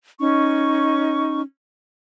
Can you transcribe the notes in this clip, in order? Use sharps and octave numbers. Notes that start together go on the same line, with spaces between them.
C#4 D#4 C#6